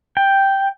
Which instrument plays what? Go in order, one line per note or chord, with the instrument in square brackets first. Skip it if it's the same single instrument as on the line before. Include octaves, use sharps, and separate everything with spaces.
[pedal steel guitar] G5